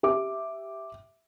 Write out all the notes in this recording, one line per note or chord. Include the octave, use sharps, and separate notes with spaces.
G4 E5 D6